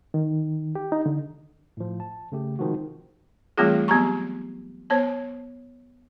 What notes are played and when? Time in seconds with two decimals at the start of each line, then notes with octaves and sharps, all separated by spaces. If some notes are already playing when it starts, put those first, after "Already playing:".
0.14 D#3
0.75 G4
0.92 D#4
1.06 D3
1.77 A2 F3
2.00 A5
2.32 C#3 A3 G4
2.59 C3 D#3 F3 G#3 F#4
3.58 E3 G3 A3 C4 F4 G#4
3.88 F#3 B3 C4 G4 A#5 C#6
4.90 B3 C5 C#5 A5